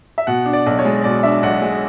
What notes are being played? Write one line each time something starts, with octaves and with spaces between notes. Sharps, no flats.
E5
B2 F#5
D4
D5
B1
C#5
G#3
B2 D5
D4 E5
B1 F#5
G#3